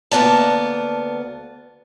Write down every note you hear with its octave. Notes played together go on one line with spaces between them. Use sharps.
D2 A#3 B3 D5 A5